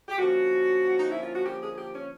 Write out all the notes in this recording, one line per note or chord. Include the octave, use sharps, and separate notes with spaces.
G4
D3 F3 A#3 C#4 F#4
D#4
E4
F4
F#4
G4
G#4
G4
C#4